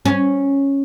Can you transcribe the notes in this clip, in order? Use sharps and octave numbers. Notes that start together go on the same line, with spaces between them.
C#4